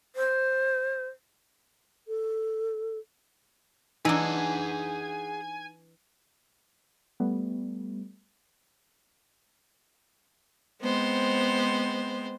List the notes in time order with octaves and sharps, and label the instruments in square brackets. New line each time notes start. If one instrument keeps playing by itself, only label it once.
[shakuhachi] C5
[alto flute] A4
[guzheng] E3 D4 [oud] D#4 [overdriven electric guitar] G#4 F#5 [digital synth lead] G#5
[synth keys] G3 A3 B3
[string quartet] G#3 B3 C4 C5